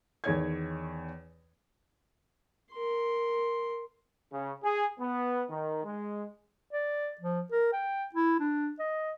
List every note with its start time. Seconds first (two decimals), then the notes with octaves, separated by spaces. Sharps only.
0.24 E2 D#3 C#5 G#6
2.72 A#4 C6
4.32 C#3
4.63 G#4
4.99 B3
5.49 D#3
5.84 G#3
6.71 D5
7.20 F3
7.52 A#4
7.73 G5
8.15 E4
8.39 D4
8.79 D#5